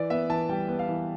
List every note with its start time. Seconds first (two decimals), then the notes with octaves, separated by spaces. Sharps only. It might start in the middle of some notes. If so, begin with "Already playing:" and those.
Already playing: E3 D5
0.10 B3 E5
0.29 E3 A5
0.49 G3 G5
0.68 B3
0.79 F5
0.88 E3